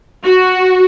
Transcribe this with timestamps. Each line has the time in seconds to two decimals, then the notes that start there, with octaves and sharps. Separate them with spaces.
0.24 F#4